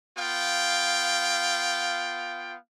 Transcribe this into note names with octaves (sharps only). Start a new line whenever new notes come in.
B3 F4 F5 G5